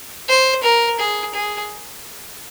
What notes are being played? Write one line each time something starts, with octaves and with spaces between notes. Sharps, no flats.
C5
A#4
G#4
G#4